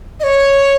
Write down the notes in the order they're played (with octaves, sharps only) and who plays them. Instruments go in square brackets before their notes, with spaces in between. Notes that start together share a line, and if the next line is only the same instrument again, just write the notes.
[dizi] D#5
C#5